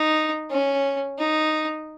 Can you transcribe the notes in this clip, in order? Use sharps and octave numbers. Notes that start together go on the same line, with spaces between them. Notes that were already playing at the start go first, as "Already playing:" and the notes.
Already playing: D#4
C#4
D#4